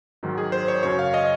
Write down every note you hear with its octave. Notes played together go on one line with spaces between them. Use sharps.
G#2 D#3 F#3
G#4
C5
C#5
F#2 C#3 F#3 C#5
F5
D#5